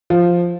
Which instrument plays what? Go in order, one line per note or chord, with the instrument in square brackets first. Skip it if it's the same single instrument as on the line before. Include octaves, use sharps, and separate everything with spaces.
[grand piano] F3